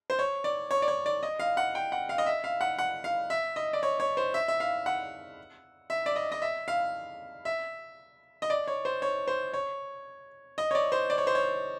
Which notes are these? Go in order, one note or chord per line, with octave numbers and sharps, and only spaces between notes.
C5
C#5
D5
C#5
D5
C#5
D5
D#5
F5
F#5
G5
F#5
F5
D#5
E5
F5
F#5
F#5
F5
E5
D#5
D5
C#5
C#5
C5
E5
E5
F5
F#5
E5
D5
D#5
D#5
E5
F5
E5
D#5
D5
C#5
C5
C#5
C5
C#5
D#5
C#5
D5
C5
D5
C#5
C5
C#5